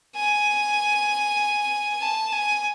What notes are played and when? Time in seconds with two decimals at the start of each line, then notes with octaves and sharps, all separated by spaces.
0.16 G#5
2.01 A5
2.33 G#5